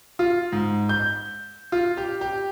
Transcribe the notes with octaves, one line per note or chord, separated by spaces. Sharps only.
F4
G#2
G6
F4
G4
G4